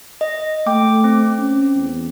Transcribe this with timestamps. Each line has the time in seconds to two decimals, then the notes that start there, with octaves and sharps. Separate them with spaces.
0.21 D#5
0.67 A3 G5 D6
1.04 C4
1.38 C#4
1.76 E2